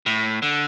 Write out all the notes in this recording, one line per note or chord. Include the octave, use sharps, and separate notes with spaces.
A2
D3